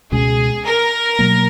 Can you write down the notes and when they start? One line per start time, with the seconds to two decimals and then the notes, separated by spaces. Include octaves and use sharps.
0.12 C#2 B2 G#3 C#4 G#4
0.65 A#4
1.19 B2 F#3 A#3